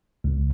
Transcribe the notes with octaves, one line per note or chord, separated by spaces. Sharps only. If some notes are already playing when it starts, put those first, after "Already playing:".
C#2